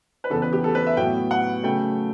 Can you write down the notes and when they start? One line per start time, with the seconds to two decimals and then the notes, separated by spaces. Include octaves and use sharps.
0.24 B4
0.30 E2 C#3 E3 B3 A4
0.42 B4
0.53 G4
0.64 A4
0.75 B4
0.87 E5
0.97 A2 F#3 B3 G5
1.31 F#5
1.64 C#3 F#3 A3 G5